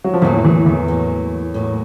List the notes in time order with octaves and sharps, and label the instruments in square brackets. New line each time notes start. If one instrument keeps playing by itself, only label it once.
[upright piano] F#3
F3
[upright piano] E2 E3 [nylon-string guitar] A2 F#3 A#3
[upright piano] E2 E3
E2 E3
[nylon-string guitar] A2 F#3 A#3
A2 F#3 A#3